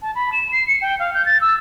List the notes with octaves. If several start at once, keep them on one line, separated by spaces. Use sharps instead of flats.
A5
B5
E7
C7
C#7
G5
F5
G6
A6
E6